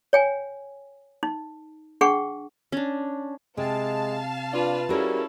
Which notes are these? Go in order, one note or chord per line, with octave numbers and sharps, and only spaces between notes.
C#5 G5 G#5
D#4
D4 G#4 F#5 G5 C#6
C#4 D4
C3 G#3 F5 A5
D4 F4 B4
G3 C#4 E4 F#4 G#4 A#4